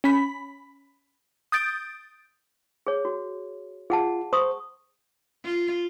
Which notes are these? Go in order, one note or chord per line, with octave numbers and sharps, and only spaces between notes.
C#4 B5 B6
D#6 G6 A6 D7
G#4 C#5
F#4
F4 G#4 F#5 A5
C5 C#6 D#6
F4